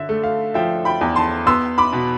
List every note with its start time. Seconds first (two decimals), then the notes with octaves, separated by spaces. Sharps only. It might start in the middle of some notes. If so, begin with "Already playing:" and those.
Already playing: D3 E5
0.09 A3
0.23 F5
0.54 F3 E5 G5
0.85 G5 B5
1.01 E2
1.16 A5 C6
1.46 B3 C6 E6
1.78 B5 D6
1.93 B2